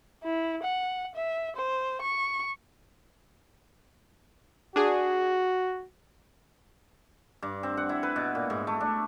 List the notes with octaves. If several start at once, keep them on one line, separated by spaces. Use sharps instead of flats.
E4
F#5
E5
C5
C#6
D4 F#4 G#4
G2
C4
F#5
E4
B4
B2
A#2
G#2
A3
D4